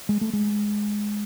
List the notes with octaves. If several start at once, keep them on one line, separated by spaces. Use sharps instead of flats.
G#3
A3
G#3